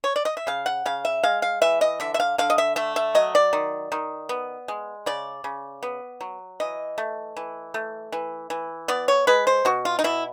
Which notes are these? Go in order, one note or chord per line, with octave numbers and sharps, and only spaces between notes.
C#5
D5
D#5
E5
C#3 F5
F#5
C#3 F5
E5
G#3 F5
F5
E3 E5
D#5
D3 E5
E5
F5
D3 F5
D#5
E5
A3 E5
E5
F#3 D#5
D5
D#3
D#3
B3
G#3
C#3 D5
C#3
B3
F#3
E3 D#5
A3
E3
A3
E3
E3
B3 D5
C#5
G#3 B4
C5
B2 F#4
F4
D#4
B2 E4